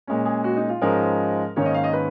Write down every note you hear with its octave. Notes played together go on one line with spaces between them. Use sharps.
A#2 G#3 C#4
G#4
F#4
D#4
F4
G#2 F3 G#3 C#4 A#4
G#2 D#3 A#3 C#4 C#5
D#5
F5
D#5
B4